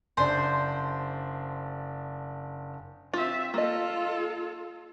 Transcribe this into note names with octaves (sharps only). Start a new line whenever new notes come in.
F#1 D4 C5 C6
C4 F4 E5
A#3 F4 A4 D#5